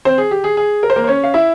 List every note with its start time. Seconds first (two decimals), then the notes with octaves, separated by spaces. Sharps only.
0.05 C4 C5
0.18 G#4
0.31 G4
0.44 G#4
0.57 G#4
0.83 A#4
0.90 C5
0.96 A#3 A#4
1.04 C5
1.07 C#4 C#5
1.24 F5
1.34 E4 E5